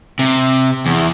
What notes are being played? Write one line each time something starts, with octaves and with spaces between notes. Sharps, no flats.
C3
E2